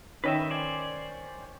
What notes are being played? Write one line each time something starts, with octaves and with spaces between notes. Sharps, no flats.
D#3 C#4 B4 D#5 E5 G5
C5 D5 G#5